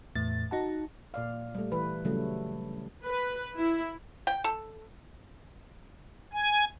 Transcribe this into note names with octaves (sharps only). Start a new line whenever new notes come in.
E2 A2 A6
D#4 F#4 F#5 A5
A#2 D5 F5
G3 A3
E3 B4
C#3 F#3 G3 A3
B4
E4
G5
A4
G#5